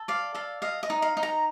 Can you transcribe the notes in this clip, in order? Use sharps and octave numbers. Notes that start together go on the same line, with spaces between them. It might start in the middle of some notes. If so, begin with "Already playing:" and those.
Already playing: A4
D5 F5
A4 F5
D#5 F5
D#5
D#4
F5
D#4
A#5